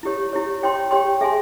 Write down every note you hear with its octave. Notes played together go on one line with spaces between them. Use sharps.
E4 G4 C#5
E4 G4 C#5
G4 C#5 G5 C6
G4 C#5 G5 C6
G#4 E5 G#5 C6